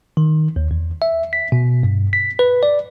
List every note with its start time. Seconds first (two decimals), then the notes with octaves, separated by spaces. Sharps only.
0.17 D#3
0.56 D#2
0.71 E2
1.02 E5
1.33 B6
1.52 B2
1.83 G2
2.13 B6
2.39 B4
2.63 D5